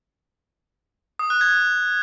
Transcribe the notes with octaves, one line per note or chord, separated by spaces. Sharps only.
D#6
F#6
G#6